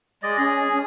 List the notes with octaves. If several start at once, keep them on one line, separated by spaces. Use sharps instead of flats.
G#3 D5 D#5
C#4 G#4
C#4